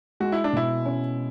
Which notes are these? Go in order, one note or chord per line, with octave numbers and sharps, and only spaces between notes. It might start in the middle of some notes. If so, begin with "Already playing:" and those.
G#3 F#4
E4
D4
B2 E4
C#4